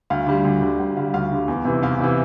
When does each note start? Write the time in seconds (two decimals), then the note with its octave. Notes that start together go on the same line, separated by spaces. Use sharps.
0.10 D2 F5
0.27 D3 G3
0.45 D2
0.61 D3 G3
0.78 D2 G5
0.97 D3 G3 F5
1.13 D2 F5
1.31 D3 G3
1.48 E2
1.65 C3 E3
1.83 E2 F5
2.00 C3 E3